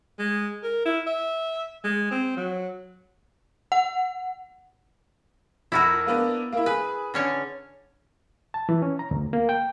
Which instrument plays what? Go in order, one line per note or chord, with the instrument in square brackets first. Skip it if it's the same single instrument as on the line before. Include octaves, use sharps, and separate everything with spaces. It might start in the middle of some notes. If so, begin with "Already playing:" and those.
[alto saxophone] G#3
A#4
E4
E5
G#3
C4
F#3
[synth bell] F#5
[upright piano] F2 [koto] E4 F#4 A#4
[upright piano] A#3 B3 D4
A#3 E4
[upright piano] G#4 [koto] B4
[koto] D3 C#4 C#5
[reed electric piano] A5
E3
C#4
A#5
D2
A#3
G5